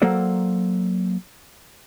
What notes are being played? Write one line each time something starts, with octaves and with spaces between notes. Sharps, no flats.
F#3 A#3 A4 C5 D5